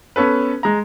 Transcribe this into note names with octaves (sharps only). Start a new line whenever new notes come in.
B3 C#4 A4 B4
G#3 A#5